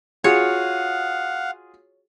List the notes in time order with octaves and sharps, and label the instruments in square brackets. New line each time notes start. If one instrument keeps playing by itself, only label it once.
[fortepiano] F4 F#4 G#4 [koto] C#5 [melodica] F5 F#5